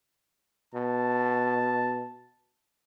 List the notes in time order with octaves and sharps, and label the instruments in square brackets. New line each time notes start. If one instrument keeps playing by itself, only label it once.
[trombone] B2 [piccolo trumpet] A5